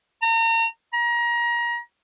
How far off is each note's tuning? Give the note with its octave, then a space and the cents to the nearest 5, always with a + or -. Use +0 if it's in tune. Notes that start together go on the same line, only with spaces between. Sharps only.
A#5 -40
A#5 +30